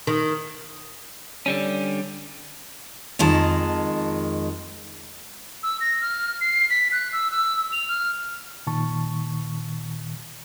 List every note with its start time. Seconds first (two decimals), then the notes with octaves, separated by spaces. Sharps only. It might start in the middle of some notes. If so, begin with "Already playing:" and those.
0.07 D#3
1.46 D3 G3 C#4
3.19 F2 D#3 G#3 A5
5.63 E6
5.81 A#6
6.02 F6
6.41 C7
6.70 B6
6.92 F#6
7.13 E6
7.31 E6
7.72 F7
7.89 F6
8.67 A#2 D#3 A5 C#6